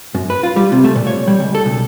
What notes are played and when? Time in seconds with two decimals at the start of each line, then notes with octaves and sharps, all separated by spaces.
0.15 F#2
0.30 B4
0.43 F4
0.56 G3
0.72 C3
0.84 A3
0.96 A#2
1.07 C#5
1.27 G3
1.40 C#2
1.55 A4
1.66 B1